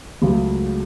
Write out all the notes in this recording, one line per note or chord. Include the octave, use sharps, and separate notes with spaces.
C#2 C#3 F#3 A3